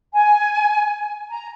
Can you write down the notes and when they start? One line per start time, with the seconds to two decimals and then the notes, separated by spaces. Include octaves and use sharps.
0.14 G#5
1.31 A#5